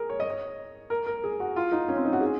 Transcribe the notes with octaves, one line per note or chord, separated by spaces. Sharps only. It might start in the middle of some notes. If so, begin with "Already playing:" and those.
Already playing: G#4 A#4
C#5
D#5
C#5
A#4
A#4
G#4
F#4
F4
D#4
C#4
C4
D#4
F#4
G#4